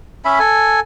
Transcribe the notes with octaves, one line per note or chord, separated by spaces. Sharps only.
C#4 E5 B5
A4 G#5